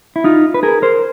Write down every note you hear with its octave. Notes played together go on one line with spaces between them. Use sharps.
E4
D#4 F4
B4
G#4 A#4
A#4 C5